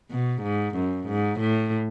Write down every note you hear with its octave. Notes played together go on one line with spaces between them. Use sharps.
B2
G#2
F#2
G#2
A2